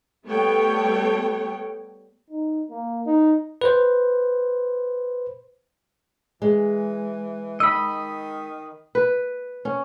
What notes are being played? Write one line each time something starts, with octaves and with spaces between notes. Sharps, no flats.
G3 A3 B3 A4 C#5 G5
D#4
A#3
D#4
B4 C5
E3 G#3
D#3 D#5 B5 E6
B4
C#4